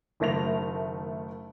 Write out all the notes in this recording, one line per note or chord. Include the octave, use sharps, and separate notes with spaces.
F#1 D#3 A3 A#6 F7